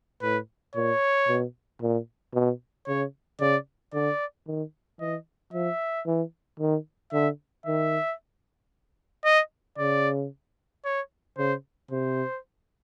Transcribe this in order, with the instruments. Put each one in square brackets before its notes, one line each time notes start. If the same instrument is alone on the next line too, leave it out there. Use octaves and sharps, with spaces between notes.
[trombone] A2 [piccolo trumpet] B4
[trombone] A#2 [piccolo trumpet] C#5
[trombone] B2
A#2
B2
[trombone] C#3 [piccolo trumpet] C#5
[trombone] C#3 [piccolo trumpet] D5
[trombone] D3 [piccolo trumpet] D5
[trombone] D#3
[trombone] E3 [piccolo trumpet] D#5
[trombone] F3 [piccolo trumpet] E5
[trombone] E3
D#3
[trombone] D3 [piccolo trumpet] E5
[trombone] D#3 [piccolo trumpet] E5
[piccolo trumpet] D#5
[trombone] C#3 [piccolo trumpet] D5
[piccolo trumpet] C#5
[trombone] C#3 [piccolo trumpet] C5
[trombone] C3 [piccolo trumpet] C5